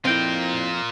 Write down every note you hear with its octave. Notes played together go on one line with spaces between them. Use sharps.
F2 C4 E4 F4 A#4 G5